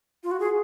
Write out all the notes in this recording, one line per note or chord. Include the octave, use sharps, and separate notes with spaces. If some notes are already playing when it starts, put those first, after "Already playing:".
F4
F#4
G#4